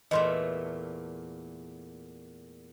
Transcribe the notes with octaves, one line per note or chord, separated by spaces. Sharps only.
E2 A#2 A3 D#5 C6